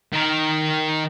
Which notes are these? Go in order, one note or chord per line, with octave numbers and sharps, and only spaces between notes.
D#3 A#4